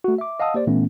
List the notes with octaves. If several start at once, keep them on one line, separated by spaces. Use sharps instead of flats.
A3 F#4
E5 D6
D#5 F5 F#5 A5 D#6 E6
A#3 G4 C5 D5
A#2 E3 A3 B3 C#4